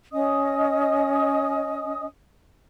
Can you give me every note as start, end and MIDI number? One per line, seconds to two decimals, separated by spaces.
0.12 2.05 61
0.12 2.05 75
0.12 2.05 87